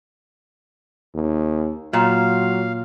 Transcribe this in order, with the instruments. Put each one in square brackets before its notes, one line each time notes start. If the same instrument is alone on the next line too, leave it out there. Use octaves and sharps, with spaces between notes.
[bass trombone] D#2
[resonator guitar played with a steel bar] A#2 [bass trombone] F#3 [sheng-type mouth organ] F5